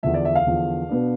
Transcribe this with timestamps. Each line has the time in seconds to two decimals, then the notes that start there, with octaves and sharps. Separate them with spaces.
0.03 E2 D3 F3 E5
0.14 D5
0.25 E5
0.35 F5
0.46 E2 D3 F3
0.89 B2 B3 D4